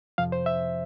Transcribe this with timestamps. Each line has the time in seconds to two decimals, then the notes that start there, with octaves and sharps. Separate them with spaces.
0.18 F2 C3 F3 F5
0.32 C5
0.46 E5